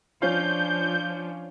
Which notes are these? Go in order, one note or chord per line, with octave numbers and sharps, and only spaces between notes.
F3 C#4 D4 F4 F5 G6